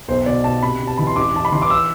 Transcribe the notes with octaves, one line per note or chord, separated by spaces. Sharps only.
B1 C5
B2 D5
B2 A5
C3 B5
C3
A5
E3 B5
C6
A1 D6
A1 A5
B5
E3 C6
D6
E6